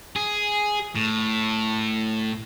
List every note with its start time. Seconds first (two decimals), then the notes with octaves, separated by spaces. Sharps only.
0.16 G#4
0.95 A2